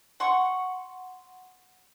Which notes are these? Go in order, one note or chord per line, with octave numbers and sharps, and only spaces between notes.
F#5 C6 C#6